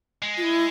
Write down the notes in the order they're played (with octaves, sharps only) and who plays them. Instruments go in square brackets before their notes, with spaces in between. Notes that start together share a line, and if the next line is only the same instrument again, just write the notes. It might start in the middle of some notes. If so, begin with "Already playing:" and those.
[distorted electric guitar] G#3
[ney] F4
E4